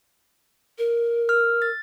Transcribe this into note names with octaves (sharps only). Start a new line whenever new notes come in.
A#4
E6 F6
A6